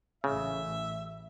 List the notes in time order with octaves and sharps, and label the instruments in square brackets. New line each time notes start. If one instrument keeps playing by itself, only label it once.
[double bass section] A1 [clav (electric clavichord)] C#3 [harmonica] E5